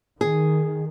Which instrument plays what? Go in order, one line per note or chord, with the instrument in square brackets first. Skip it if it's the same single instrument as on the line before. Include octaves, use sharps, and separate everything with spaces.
[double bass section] D#3 [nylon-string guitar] G#4